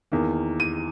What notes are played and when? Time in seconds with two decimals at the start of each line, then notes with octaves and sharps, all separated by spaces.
0.12 E2 D#3 A#3
0.60 D#7